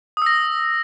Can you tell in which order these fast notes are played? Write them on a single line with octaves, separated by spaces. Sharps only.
D#6 E6 A#6